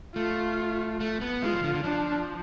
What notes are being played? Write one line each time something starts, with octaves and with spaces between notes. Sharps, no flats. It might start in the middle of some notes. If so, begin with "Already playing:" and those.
A3 F4
A3
B3
G#3 F4
F3
D3
D3
F3 D4